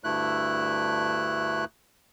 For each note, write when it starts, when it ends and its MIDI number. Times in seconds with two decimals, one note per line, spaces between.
0.04 1.65 38
0.04 1.65 43
0.04 1.65 57
0.04 1.65 64
0.04 1.65 90